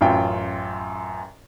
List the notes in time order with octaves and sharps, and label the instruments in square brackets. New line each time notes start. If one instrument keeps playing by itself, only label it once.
[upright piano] A1 F#2 F4 G5